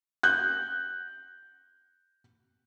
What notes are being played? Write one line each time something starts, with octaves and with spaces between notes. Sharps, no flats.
F#6 G6